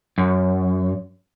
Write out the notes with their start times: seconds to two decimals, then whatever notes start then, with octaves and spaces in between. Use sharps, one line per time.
0.18 F#2